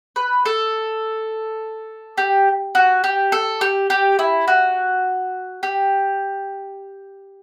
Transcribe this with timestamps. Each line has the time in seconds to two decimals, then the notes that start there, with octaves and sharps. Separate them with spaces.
0.16 B4
0.46 A4
2.18 G4
2.75 F#4
3.04 G4
3.32 A4
3.61 G4
3.90 G4
4.19 E4
4.48 F#4
5.63 G4